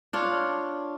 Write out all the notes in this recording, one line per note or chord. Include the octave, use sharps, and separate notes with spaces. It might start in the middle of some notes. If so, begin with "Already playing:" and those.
D4 F4 C#5